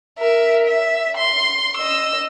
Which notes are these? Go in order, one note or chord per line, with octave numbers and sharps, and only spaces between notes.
A#4 E5
E5
C6
D#5 E6